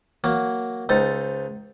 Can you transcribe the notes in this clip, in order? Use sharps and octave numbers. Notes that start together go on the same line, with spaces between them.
F#3 A#3
C#2 D#4 A4 C5